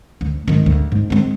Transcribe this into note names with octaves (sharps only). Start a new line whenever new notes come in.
D2
G#2 D#3
D2
G#2
G#3 C4